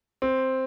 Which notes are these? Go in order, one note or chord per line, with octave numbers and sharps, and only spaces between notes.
C4